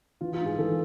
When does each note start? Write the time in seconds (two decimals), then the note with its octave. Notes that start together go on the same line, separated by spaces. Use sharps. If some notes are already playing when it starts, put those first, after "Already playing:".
0.21 E3 F4
0.34 F4
0.41 G#2
0.46 G#4
0.58 E3 A4